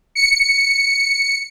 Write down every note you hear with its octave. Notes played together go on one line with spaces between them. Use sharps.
C#7